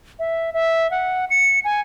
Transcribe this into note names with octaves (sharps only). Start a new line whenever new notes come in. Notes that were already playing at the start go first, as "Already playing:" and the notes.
E5
E5
F#5
C#7
G#5